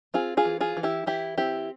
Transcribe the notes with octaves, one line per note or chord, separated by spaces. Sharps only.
C4 F4 G#4
F4 G#4
E3
F4 G#4
E3
E4 G4
E3 E4 G4
C4 E4 G4